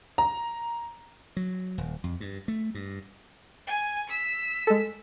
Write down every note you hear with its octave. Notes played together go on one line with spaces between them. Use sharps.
A#5
F#3
D#1
F2
G2
A3
G2
G#5
E6 B6
G#3 A4